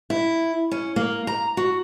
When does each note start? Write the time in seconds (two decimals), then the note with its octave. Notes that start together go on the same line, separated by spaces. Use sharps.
0.10 E4
0.71 C#4
0.96 A#3
1.27 A#5
1.57 F#4